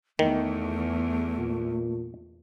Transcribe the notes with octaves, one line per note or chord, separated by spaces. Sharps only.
E2 D#3 A3
A#2